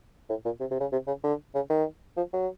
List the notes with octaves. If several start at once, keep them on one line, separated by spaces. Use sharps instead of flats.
A2
A#2
C3
C3
C#3
C3
C#3
D3
C#3
D#3
F3
F#3